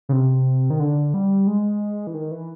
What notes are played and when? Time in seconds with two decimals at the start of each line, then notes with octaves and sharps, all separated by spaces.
0.09 C#3
0.12 C3
0.70 D#3
0.80 D3
1.14 G3
1.47 G#3
2.07 E3
2.14 D#3
2.31 E3